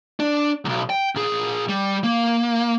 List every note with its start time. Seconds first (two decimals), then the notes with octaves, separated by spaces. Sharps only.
0.20 D4
0.65 B1 E2
0.90 G5
1.15 A#2 G#4
1.69 G3
2.04 A#3